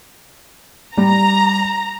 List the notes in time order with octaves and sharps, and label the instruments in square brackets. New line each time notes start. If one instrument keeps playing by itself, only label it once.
[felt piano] G3 [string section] A#5